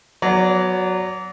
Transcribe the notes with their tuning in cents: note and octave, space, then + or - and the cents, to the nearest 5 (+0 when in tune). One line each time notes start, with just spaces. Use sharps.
F#3 +0 B3 +0 D5 -30